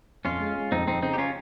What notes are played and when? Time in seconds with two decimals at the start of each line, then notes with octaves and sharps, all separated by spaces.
0.25 F2 C#4 F4
0.40 G#3
0.56 G#3
0.72 F2 C4 D#4
0.87 F2 C4 D#4
1.02 C#3 C4 D#4
1.14 G4
1.18 C#4 F4